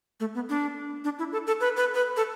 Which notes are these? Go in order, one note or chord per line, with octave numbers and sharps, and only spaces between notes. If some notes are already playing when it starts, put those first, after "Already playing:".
A3
B3
D4
D4
E4
A4
A4
B4
B4
B4
A4